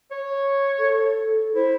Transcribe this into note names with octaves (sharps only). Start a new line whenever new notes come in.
C#5
A4
E4 C5